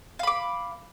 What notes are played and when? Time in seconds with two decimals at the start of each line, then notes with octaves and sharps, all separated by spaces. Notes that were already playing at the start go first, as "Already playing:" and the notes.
0.19 F5
0.23 B5
0.27 D6